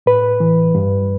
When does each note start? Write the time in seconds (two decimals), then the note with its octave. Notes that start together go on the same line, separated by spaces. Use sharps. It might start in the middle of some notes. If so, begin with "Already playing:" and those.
0.06 A2 B4
0.40 E3
0.75 G2